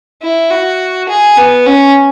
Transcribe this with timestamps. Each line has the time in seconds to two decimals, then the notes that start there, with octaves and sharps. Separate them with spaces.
0.22 E4
0.50 F#4
1.09 G#4
1.37 B3
1.66 C#4